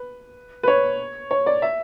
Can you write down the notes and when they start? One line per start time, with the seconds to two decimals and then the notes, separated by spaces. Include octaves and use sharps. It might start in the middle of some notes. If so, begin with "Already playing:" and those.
Already playing: B4
0.63 B4
0.68 C#5
1.31 C#5
1.46 D5
1.62 E5